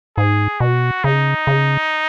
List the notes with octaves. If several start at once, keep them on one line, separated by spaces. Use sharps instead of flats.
G#2 G#4
B2 F#4
C#3 D#4
C#3